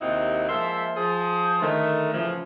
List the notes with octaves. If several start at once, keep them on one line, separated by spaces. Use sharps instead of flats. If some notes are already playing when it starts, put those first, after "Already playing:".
D#2 C3 C4 D#4 E4 F#4
F3 G#3 A#3 C5 E5
F3 G#4 C5
D3 D#3 A3
A2 C#3 E3 F3 E4 F4